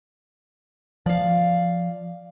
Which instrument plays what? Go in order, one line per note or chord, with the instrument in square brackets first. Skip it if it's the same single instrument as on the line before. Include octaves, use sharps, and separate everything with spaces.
[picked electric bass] F3 [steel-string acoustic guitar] D5 F5